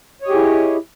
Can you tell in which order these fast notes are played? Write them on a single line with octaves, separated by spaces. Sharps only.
C#5 D#5 G4 G#4 E4